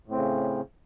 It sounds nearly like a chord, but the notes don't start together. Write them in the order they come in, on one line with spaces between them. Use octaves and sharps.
A2 C4 C#3